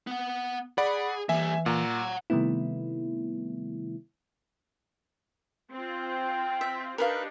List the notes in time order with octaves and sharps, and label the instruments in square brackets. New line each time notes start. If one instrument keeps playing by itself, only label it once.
[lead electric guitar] B3 F#5
[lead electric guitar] G#4 [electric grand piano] D5 F#5 B5
[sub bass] E3 [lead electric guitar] G3 A#3 [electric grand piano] E5 G#5
[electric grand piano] A#2 [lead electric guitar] F#5 A#5
[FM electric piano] C3 D#3 G3 A3 B3 E4
[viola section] C4 F4
[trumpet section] G5
[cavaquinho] E5
[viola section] D4 D#4 G4 [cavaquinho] A#4 B4 F5